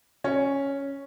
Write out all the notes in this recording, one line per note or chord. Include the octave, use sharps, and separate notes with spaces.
C#4